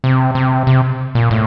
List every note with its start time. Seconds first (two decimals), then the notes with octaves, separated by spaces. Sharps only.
0.04 C3
0.35 C3
0.67 C3
1.15 A#2
1.31 A2